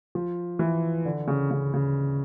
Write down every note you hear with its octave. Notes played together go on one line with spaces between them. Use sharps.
F3
E3
D3
C#3
C#3
C#3